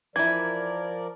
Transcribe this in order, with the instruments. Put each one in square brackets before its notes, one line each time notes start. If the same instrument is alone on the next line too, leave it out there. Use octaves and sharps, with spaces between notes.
[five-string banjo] E3 E4 [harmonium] F3 A#4 D5 [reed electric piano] G#6